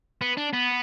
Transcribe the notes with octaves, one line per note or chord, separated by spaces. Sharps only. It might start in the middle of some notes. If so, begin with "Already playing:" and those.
B3
D4
B3